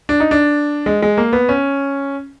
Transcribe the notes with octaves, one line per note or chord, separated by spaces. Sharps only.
D4
D#4
D4
G#3
G#3
A#3
B3
C#4